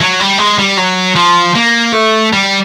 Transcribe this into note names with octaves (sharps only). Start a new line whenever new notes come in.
F#3
G3
G#3
G3
F#3
F3
A#3
A3
G3